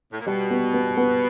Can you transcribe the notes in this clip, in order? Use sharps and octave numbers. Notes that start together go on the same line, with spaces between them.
A2
A#2
B2 G3
B3
B3
B3